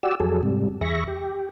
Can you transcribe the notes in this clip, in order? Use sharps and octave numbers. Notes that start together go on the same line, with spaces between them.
F#4 G4 D5 E6
F2 F#3 G#4 A4
G#2 C3 G3
E2 G#4 E5 B5 C#6 A#6
G4